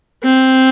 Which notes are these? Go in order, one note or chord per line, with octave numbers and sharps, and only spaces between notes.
C4